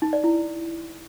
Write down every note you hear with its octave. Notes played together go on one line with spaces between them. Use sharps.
D#4
D5
E4